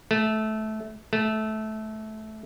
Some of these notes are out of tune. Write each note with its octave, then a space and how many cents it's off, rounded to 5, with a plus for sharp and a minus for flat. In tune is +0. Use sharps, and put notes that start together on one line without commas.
A3 -15
A3 -15